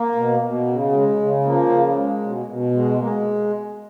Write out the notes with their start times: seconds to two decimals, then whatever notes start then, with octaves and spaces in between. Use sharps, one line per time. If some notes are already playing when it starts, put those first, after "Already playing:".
Already playing: A#3
0.15 B2
0.40 B2
0.67 C#3
0.92 G#3
1.18 C#3
1.44 F3 A#3
1.69 C#3
1.95 G#3
2.21 B2
2.46 B2
2.72 G#3
2.97 G#3 A#3